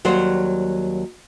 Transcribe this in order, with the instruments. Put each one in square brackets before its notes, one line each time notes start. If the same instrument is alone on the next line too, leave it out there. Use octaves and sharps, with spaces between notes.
[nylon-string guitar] D#2 F#3 G3 C5